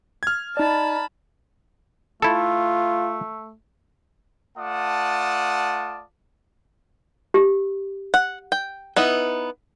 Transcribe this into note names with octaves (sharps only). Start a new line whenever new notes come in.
F6 G#6
D#4 D5 A5 B5
A3 E4 F4 A4
A3 F4 D5 F#5 A5 D#6
G4
F#5
G5
B3 D#4 E4